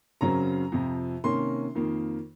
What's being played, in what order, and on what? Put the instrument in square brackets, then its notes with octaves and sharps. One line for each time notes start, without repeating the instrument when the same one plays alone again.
[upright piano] F#2 C#3 F#3 C4 A#5
F2 C3 F3
C3 D#3 A#3 C#4 C6
F2 D#3 A#3